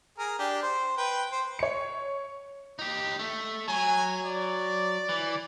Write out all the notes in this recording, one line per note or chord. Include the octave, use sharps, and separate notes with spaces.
G#4 A#4
D4 G4
C5
B4 G5
C5
C#5 C#7
D#4 G4
A3
F#3 G#5
D5
E3